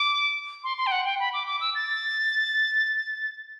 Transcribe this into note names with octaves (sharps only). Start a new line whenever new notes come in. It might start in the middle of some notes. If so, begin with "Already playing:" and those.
Already playing: D6
C6
C6
G5
F#5
G5
B5
D6
D6
E6
A6